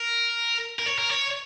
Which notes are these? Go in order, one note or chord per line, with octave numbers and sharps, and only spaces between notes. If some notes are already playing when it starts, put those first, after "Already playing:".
Already playing: A#4
A#4
C#5
A#4
C#5